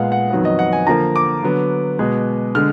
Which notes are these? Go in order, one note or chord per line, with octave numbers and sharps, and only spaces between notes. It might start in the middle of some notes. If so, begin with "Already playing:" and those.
Already playing: A#2 G#3 B3 F5 F#5
F#5
F2 D#3 F#3 B3
D#5
F#5
G#5
D3 F3 A#3 A#5
D6
D3 F#3 B3
B2 G#3 B3
D3 G#3 F6